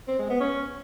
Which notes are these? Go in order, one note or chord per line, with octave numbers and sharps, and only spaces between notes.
C4
G#3
B3
C#4